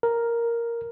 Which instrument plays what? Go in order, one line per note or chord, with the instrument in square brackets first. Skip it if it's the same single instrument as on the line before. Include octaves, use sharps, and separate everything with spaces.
[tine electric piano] A#4